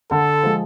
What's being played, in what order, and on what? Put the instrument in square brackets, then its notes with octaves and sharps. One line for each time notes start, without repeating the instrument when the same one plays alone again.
[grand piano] D3 [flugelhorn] A4
[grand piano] F3 G#3